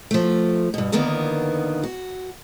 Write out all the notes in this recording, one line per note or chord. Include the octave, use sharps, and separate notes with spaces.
F3 A3
G2 B2
E2 D3 D#3 A#3 B3
F#4